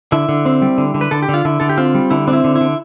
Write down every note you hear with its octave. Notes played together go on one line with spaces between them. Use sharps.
D3 E4
D3
C4
G3
D3
D3
B4
D3 A4
G4
D3
F4
D3 E4
D3 A4
G4
C4 F4
G3
D3 E4
C4 D4
E4
D3
E4
D3